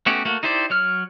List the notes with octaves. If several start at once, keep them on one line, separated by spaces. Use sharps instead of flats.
A3 B3 C#4 F#4 G4
A3 A#3 F#4
D#4 E4 G4 C5 D5
F#3 C#5 F6